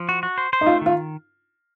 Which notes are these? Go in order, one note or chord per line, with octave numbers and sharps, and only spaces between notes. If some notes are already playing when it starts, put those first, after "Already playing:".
Already playing: F3
F#4
F#4
C5
C5
D#4
A3 F4
D#3 F4